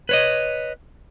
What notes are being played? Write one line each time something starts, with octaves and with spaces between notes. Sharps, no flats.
B4 C#5 D#5